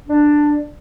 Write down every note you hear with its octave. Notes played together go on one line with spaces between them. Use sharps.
D4